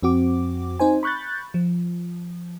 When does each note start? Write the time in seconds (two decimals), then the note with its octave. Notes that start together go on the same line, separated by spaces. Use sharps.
0.03 F2 C4 F#4 D6
0.80 C4 D#4 C5 G#5
1.03 B5 C#6 F#6 G6 A6
1.54 F3